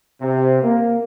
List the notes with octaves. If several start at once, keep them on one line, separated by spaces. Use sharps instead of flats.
C3
A#3